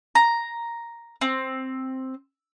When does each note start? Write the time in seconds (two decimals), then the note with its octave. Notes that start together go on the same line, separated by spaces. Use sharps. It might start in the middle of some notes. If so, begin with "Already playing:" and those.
0.15 A#5
1.21 C4